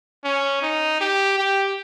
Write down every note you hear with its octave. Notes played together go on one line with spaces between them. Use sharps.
C#4
D#4
G4
G4